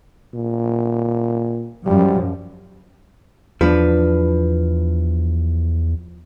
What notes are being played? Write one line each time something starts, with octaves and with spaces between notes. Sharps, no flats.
A#2
F#2 F3 G3
E2 F3 D4 B4